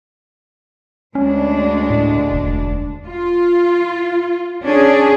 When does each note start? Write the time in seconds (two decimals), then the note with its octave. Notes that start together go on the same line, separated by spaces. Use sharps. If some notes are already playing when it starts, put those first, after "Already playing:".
1.15 D2 G#3 C#4 D4
1.90 A2
2.32 E1
3.07 F4
4.63 C#4 D4 G#4